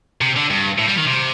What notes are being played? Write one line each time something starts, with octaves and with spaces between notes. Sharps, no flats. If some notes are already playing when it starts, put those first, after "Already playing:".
C3
D3
G2
A2
G3
D#3
C3